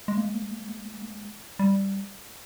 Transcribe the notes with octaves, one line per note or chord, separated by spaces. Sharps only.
G#3
A#3
G#3
A#3
G#3
A#3
G#3
A#3
G#3
A#3
G#3
A#3
G#3
G3